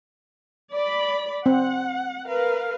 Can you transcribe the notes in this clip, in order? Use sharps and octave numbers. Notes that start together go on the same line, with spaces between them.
D5 B5
C4 F#5
A#4 B4 F5